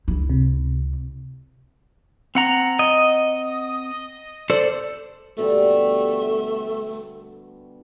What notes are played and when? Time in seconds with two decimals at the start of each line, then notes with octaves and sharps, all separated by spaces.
0.08 C#2 E4
0.30 C3
2.35 C4 F#5 A#5
2.79 D#5
4.50 A4 C5 D5
5.38 B2 D3 G3 A3